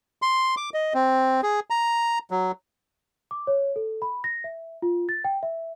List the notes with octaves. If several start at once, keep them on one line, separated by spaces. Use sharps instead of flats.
C6
D6
D#5
C4
G#4
A#5
F#3
D6
C#5
A4
B5
A#6
E5
F4
A6
G5
E5